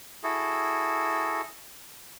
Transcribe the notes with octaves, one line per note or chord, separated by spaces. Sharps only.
E4 F#4 G#4 A4